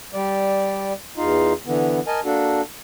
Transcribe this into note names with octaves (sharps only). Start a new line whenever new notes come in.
G3 D5
E2 D#4 F4
D3 E3 B3
A#4 D#5 G#5 A5
A#3 D4 F#4 A4